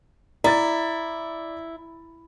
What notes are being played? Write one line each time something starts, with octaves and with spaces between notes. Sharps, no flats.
E4 D5 A#5 A6